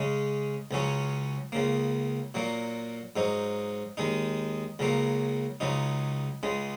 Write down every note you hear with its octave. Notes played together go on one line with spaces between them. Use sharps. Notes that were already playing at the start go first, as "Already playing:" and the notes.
Already playing: C#3 G#3 C#4
C#2 C#3 F#3 C#4
C#2 C#3 A#3
A#2 F#3 A#3
G#2 F#3 D#4
D#2 D#3 G#3 D#4
C#2 C#3 F#3 A#3
C#2 C#3 F#3 D#4
C#2 C#3 G#3